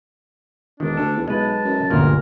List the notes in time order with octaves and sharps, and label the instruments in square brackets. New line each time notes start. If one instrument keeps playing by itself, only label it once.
[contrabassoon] E1 [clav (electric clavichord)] D#3 [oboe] D4
[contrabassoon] D2 [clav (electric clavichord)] A4
[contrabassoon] E2
[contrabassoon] B1 [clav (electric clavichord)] G#3 B4 [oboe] A5
[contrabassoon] F#2
[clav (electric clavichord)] G1 D2 A#2 [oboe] A#4